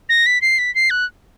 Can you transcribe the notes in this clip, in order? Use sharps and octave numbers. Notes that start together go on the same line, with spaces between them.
A#6
B6
C7
B6
C7
F#6